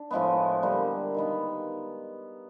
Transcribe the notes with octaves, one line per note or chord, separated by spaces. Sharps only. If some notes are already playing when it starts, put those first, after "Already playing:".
Already playing: D4
A2 F3 G#3 B3
D3 G3 A#3
D#3 G#3 B3